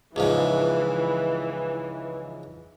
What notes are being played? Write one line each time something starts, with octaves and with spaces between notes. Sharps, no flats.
C#2 G#2 E3 F3